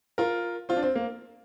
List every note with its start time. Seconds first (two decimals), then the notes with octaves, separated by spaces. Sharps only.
0.18 F4 A#4
0.69 C4 F4
0.77 D4
0.83 C4
0.95 A#3